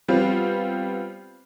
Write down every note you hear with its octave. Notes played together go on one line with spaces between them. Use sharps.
G3 B3 C4 F4